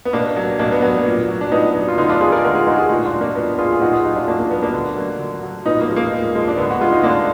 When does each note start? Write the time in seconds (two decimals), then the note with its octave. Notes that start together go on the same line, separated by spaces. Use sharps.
0.05 B3
0.13 B2 A#3 D4
0.37 F#3
0.59 B2 A#3 D4
0.72 B3
0.82 F#3 B3
1.06 A#2
1.28 F#3
1.41 D4
1.52 A#2 B3 D#4
1.75 F#3
1.88 F4
1.98 D3 B3 D#4
2.09 D4 F4
2.20 G#3 F4 G#4
2.32 A#4 D5
2.44 D3 F#4 A#4
2.55 F4 G#4
2.66 G#3 D#4 F#4
2.78 F4 G#4
2.89 A#2 D#4 F#4
3.06 D4 F4
3.12 F#3
3.21 A#3 D4
3.35 A#2 B3
3.58 F#3 F4 G#4
3.72 G#4
3.81 A#2 D#4 F#4
3.93 F4 G#4
4.05 F#3 D#4 F#4
4.16 D4 F4
4.27 A#2 A#3 D4
4.39 A#3
4.50 F#3 B3
4.62 A#3 D4
4.74 D3
4.97 F#3
5.19 D3
5.43 F#3
5.65 A#2 B3 D#4
5.81 A#3
5.89 F3 G#3
5.96 A#3
6.12 A#2
6.35 F3 G#3
6.48 D4
6.57 D3 B3
6.70 F#4
6.81 G#3 F4
6.92 D#4
7.03 D3 A#3 D4